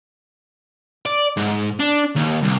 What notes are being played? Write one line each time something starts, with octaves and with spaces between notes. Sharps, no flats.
D5
G#2
D4
D#2
C2